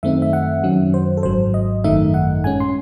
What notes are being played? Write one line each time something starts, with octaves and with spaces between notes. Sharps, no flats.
F#2 D#3 A3 C4 D#4 E5
E5
F#5
F#2 D#3 F#3 C#4
C5
A4
G#1 G#2 F#3 C5
D#5
G#1 F#2 D#3 A3 D#4 E5
F#5
A2 G#3 C#4 G#5
C6